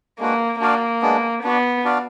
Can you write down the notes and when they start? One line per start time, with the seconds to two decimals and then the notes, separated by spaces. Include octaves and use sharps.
0.19 G#3 A#3 D4 F#4 B4
0.60 A#3 D4 F#4 D5 F5
1.01 G#3 B3 D4
1.43 B3 D4 F#4 D5
1.84 D4 F#4 D5 F5